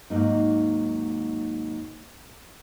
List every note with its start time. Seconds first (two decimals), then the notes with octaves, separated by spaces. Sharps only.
0.10 D#2 G#2 F#3 A#3 D#4